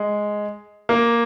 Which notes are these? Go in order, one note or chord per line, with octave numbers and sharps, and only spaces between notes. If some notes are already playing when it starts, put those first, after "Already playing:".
Already playing: G#3
A#3